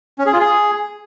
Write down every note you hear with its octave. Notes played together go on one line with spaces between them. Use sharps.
C#4
G#4
F4
G#4